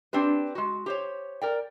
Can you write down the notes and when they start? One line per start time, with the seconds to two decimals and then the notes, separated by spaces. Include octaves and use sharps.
0.13 C4 D4 G4 B4
0.55 G#3 F#4
0.86 G4 C5 C#5
1.42 A#4 D5 G5